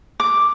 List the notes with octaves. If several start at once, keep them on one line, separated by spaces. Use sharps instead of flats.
D6